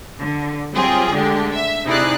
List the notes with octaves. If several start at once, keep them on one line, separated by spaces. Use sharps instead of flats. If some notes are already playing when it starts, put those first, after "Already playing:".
D3
F#3 G3 C4 F4 G4 G#4
D3 G#3 A3 D4 G4
E5
C3 D#4 E4 G#4 D5 F#6